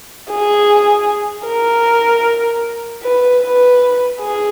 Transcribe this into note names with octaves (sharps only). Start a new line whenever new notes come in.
G#4
A#4
B4
B4
G#4